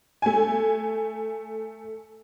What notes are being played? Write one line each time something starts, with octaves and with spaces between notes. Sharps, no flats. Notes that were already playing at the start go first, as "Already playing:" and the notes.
A3 G#5